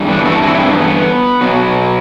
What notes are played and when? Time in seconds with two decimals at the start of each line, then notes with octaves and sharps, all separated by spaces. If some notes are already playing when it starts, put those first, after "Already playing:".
Already playing: G2 E3 G3
0.08 B3 D4
0.25 F#4 A4
0.42 C4 E4
0.54 C4 E4
0.66 B3 D4
0.78 B3
1.41 B2 F#3